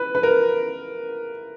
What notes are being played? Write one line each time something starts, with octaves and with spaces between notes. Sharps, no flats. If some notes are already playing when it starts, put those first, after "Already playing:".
Already playing: B4
B4
A#4